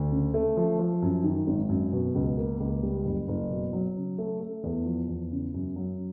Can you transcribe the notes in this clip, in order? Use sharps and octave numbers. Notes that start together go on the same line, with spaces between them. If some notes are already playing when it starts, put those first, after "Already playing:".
Already playing: D2
C#3
A3
F3
F3
F#2
D#3
G#1
F#2
B2
C#2
A#3
C#2
G3
F#1
F#1
B2
F#3
C#3
A3
A3
E2
F3
E2
C#3
F#2
F#3